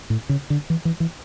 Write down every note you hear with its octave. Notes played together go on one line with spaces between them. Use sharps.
A2
C#3
D3
E3
E3
E3